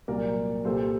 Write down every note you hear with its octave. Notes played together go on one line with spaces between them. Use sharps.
C2 A#2 F#3 A#4 D5
C2 A#2 G3 A4 C5